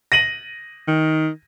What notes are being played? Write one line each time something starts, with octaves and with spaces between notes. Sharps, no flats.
A#6 D#7 F#7
D#3